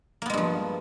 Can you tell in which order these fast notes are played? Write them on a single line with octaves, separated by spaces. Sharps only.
A#3 B3 G#3 G2 F3